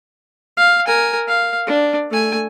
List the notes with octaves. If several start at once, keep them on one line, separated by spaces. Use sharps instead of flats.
F5
A#4 G#5
F5
D4
A3 G#5